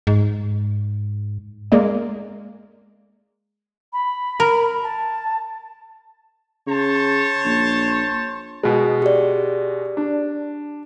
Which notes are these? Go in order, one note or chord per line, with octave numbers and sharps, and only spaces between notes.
G#2
G#3 A#3 D5
B5
A#4
A5
C#3 C5 C#5 A5
A#1
B2 G#3
G4 D5
D4